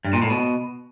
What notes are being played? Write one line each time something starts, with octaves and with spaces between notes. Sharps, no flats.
G2
A#2
A2
B2